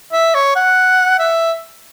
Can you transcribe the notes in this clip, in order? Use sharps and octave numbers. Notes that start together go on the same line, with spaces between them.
E5
C#5
F#5
E5